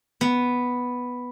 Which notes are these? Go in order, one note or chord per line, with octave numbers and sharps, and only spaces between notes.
B3